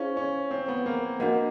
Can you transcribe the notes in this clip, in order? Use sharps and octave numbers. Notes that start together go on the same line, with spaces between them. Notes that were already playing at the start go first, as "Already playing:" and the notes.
Already playing: C#4 E4 G#4 C5 F5
C#4
C4
B3
A#3
A#3 D4 F#4 A#4 D#5 F#5